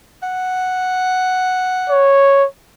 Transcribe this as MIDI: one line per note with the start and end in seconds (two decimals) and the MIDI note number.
0.23 2.15 78
1.90 2.45 73